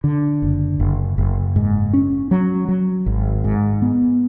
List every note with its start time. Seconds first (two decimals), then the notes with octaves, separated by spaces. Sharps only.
0.04 D3
0.42 F#1
0.80 F#1
1.18 F#1
1.56 G#2
1.93 C#4
2.31 F#3
2.68 F#3
3.06 G#1
3.44 G#2
3.82 B3